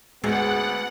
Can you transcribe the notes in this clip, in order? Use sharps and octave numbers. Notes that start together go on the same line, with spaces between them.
G#1 D2 G#3 B3 F#5